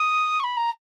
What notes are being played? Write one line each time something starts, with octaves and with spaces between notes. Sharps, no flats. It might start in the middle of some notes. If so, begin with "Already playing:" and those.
Already playing: D#6
C#6
B5
A#5